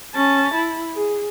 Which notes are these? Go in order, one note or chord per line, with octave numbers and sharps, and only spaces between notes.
C#4 A5
E4
G#4